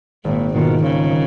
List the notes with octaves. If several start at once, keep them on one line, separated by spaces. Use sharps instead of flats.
G#1 A#2
G#2 B2 D#3 A#3 F4
G#1 C#3
D#3